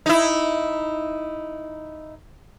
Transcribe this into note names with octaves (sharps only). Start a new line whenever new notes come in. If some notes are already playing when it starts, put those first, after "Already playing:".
D#4 E4